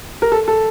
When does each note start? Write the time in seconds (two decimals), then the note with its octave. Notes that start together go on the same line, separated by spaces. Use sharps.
0.22 A#4
0.32 A4
0.48 A4